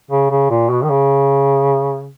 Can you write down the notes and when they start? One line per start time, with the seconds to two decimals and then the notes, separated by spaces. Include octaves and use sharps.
0.11 C#3
0.30 C#3
0.50 A#2
0.71 B2
0.83 D#3
0.90 C#3